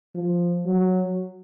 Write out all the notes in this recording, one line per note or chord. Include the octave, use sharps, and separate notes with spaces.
F3
F#3